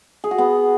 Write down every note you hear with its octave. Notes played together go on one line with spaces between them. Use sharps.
G#4
F#4
B3